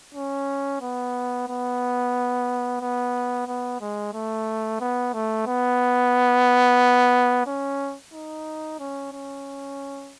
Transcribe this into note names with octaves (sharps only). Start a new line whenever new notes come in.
C#4
B3
B3
B3
B3
G#3
A3
B3
A3
B3
C#4
D#4
C#4
C#4